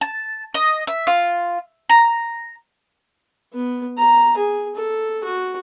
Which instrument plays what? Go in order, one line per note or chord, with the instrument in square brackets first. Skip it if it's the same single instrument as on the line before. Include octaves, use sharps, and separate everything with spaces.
[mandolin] A5
D#5
E5
F4
A#5
[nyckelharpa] B3
A#5
G#4
A4
F#4